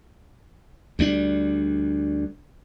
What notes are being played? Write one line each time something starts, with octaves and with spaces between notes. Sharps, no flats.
D2 G3 D4